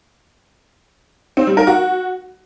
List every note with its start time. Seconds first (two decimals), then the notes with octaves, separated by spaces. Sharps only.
1.37 C4
1.47 G3
1.57 A#4
1.67 F#4